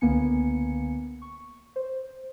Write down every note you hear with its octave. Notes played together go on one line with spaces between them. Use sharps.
C#2 D3 A#3 B3 G#5 C#7
C#6
C5